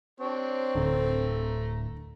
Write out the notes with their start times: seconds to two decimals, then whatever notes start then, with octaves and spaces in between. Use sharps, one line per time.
0.20 C4 D4 G4 C#5
0.75 D1 D3 A3 A#5